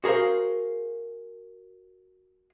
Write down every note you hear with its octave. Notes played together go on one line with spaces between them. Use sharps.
F#4 G#4 A#4 C5 F5